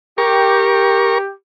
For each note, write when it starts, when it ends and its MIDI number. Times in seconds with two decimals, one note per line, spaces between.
0.18 1.31 67
0.18 1.18 70
0.18 1.18 85